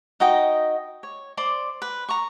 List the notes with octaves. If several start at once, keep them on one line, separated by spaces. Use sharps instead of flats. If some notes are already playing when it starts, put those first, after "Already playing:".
D#4 F#4 D#5 G5
C#5
C5 D5 C6
B4
A#5 C#6